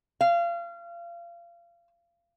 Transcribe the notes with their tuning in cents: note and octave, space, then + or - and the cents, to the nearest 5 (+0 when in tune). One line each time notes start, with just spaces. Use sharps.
F5 -30